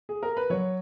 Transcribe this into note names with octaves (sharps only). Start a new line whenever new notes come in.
G#4
A#4
B4
F#3 C#5